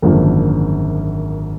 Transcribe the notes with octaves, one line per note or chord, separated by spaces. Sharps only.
G#1 F#2 D3 F3 A#3